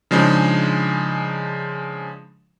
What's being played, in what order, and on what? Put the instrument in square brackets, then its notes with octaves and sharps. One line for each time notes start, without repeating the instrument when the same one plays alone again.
[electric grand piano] C#3 F3 G#3 D4 D#4